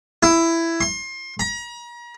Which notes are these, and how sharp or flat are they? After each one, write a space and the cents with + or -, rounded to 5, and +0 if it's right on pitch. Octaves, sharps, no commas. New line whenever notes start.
E4 +10
C6 +30
A#5 +40